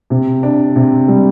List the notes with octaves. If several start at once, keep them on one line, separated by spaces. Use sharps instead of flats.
C3
D4
C3
G3